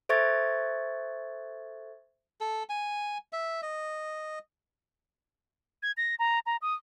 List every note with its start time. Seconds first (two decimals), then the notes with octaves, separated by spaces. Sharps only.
0.09 A4 C5 E5 C#6 G#6 A6
2.41 A4
2.69 G#5
3.33 E5
3.62 D#5
5.83 G#6
5.97 A#6
6.19 A#5
6.46 A#5
6.62 D#6